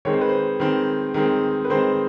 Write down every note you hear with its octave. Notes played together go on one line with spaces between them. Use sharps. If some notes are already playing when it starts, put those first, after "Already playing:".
D#3 G#3 C4 C#5
C5
B4
C5
D#3 G#3 C4
D#3 G#3 C4
B4
D#3 G#3 C4 C5